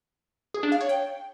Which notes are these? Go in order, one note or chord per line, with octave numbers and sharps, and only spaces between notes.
G#4
D4
F5
C#5
G5